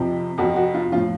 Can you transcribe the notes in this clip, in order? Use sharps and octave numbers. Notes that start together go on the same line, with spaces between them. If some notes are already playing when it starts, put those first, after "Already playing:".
Already playing: F2 C3 F3
F2 C3 F3 F#4
F#4
F4
A2 F3 F4